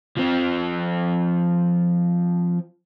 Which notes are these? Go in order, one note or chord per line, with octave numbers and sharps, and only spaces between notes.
F3 C4